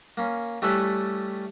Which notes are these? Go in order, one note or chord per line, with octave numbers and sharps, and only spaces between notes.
A#3 C#4
G3 A3 C#4 E4 A4 B4